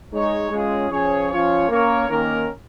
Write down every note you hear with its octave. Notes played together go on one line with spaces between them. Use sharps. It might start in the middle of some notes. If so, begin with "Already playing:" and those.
G#3 D#4 C#5
G#3 C#4 F4 G#4
F3 C#4 G#4 C#5
F3 C#4 F4 C#5
A#3 C#4 A#4 C#5
D#3 A#3 C#4 A#4